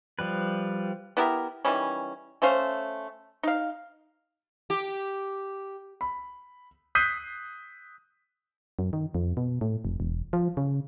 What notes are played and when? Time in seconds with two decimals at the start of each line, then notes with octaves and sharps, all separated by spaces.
0.19 F3 G3 B4
1.17 B3 E4 G4 A#4
1.65 D#3 E3 G3 C#4
2.42 A3 C#4 C5 F5
3.43 D#4 F5
4.70 G4
6.01 B5
6.95 D#6 F#6 G6 B6 C7 D#7
8.79 F#2
8.93 D#3
9.15 F2
9.37 B2
9.61 A2
9.85 F1
10.00 E1
10.33 F3
10.57 C#3